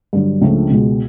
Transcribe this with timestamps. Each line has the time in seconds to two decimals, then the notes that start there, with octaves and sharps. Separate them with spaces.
0.13 G2 D3 F#3
0.41 C#2 C#3 F3 A3 D4
0.70 C#2 B2 G#3